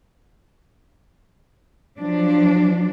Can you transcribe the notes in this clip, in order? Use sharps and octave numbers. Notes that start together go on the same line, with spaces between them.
F3 F#3 D4